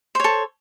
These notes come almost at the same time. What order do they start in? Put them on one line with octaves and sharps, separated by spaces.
C5 C#5 A4